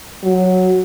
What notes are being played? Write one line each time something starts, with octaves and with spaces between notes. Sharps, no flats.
F#3